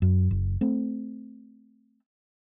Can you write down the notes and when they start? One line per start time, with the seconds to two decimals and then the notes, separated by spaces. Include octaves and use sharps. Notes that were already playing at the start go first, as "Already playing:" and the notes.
0.02 F#2
0.31 F#1
0.61 A3 C4